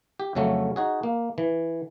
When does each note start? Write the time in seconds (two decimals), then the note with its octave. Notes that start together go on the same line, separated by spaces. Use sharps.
0.20 G4
0.35 F2 C#3 F#3 A3 C#4
0.76 D#4 F#4 G#4
1.03 A#3
1.38 E3